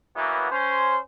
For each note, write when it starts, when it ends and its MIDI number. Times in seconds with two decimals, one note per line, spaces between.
0.15 0.48 52
0.15 0.48 54
0.15 0.48 58
0.15 0.48 59
0.51 0.96 61
0.51 0.96 72